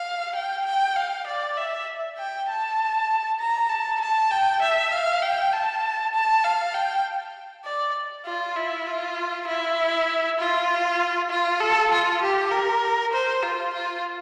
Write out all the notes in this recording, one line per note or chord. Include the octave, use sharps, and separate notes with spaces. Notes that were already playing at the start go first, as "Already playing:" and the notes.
Already playing: F5
G5
G5
F5
D5
E5
G5
A5
A#5
A5
A5
G5
E5
F5
G5
A5
A5
F5
G5
D5
F4
E4
F4
E4
F4
F4
A4
F4
G4
A#4
C5
F4
F4